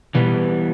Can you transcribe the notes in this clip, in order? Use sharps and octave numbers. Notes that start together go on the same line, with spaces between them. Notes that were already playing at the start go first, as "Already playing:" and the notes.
B2 E3 G3 B3